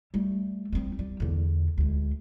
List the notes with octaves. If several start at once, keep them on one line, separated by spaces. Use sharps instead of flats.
G3 A3
G3 C4
G3
E2 D3
D2 G#3